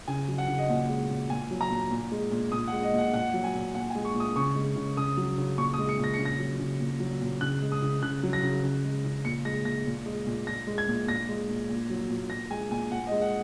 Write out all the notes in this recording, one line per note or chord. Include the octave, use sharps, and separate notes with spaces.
C#3 G#5
F#3
F#5
C#3
D#5
A#2 F#5
G#3
A#2
A#2 G#5
F#3
A#5
A#2
A#2
G#3
A#2
A#2 D#6
F#5
G#3
D#5
A#2
F#5
A#2 F#5
F#3
G#5
A#2
A#2 F#5
G#5
G#3
C#6
A#2 D#6
C#3 C#6
G#3
C#3
C#3 D#6
F#3
C#3
A#2 C#6
D#6
G#3
C#7
A#2
A#6
C#3 C#7
A#6
F#3
C#3
A#2
F#3
A#2
C#3 F#6
G#3
D#6
C#3
C#3 F#6
F#3
A#6
C#3
C#3
G#3
C#3
A#2 C#7
G#3 A#6
A#2 A#6
A#2
G#3
A#2
A#2 A#6
G#3
G#6
A#2
A#2 A#6
G#3
A#2
A#2
F#3
A#2
A#2 A#6
G#3 G#5
A#2 G#5
A#2 F#5
D#5
G#3
F#5